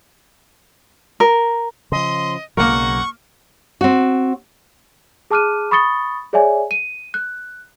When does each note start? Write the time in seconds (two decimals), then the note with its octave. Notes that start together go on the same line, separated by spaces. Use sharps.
1.20 A#4
1.92 C#3 F3 D#5 C6
2.57 B1 C#3 F#3 A#3 A#4 F#5 C#6
3.81 C4 F#4
5.31 G#4 A5 D6 F6 F#6 D#7
5.71 B5 C#6 D#6 A6 C#7 G7
6.33 G#4 C#5 D5 E5 G#5
6.71 D#7
7.14 F#6